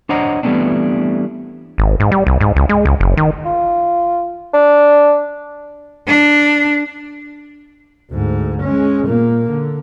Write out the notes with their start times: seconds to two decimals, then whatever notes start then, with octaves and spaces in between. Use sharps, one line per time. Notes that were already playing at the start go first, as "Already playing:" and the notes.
0.09 D4 C5 C#5 D#5 F#5 A#5
0.43 E3 G3 A3 B3 C4 D4
1.78 G#1
2.00 G#2
2.11 G3
2.27 C2
2.41 G#2
2.56 C#2
2.69 G#3
2.85 C#2
3.00 F#1
3.17 D#3
3.45 F4
4.54 D4
6.07 D4
8.11 D2 G#2
8.62 G#3 C#4
9.06 A#2 A#3
9.49 D3